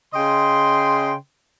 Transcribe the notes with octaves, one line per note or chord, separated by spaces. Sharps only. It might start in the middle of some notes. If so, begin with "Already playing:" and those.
C#3 D#5 G5 C6